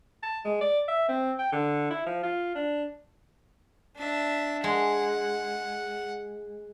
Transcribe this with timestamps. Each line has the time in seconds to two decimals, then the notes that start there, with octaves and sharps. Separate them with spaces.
0.23 A5
0.45 G#3
0.61 D5
0.88 E5
1.09 C4
1.39 G5
1.53 D3
1.90 E4
2.06 F3
2.23 F4
2.55 D4
3.97 D4 E5
4.64 G#3 F#5